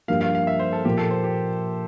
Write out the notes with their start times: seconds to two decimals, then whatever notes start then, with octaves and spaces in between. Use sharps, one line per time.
0.08 G2 F3 A#3 F5
0.21 F5
0.35 F5
0.47 E5
0.60 C5
0.73 A4
0.85 A#2 F3 A#3 G4
0.98 A4
1.10 C5
1.24 G4